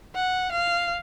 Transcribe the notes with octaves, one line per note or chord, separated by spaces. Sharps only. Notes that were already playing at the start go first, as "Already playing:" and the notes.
F#5
F5